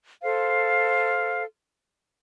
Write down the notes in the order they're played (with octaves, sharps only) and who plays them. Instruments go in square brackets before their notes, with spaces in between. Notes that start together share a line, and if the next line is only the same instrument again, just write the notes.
[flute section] A4 C5 F5